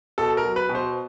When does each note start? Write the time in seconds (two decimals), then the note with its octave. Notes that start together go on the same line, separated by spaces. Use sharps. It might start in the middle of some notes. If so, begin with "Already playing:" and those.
0.18 B2 A4
0.37 A#4
0.43 F#3
0.56 B4
0.69 B2
0.75 C5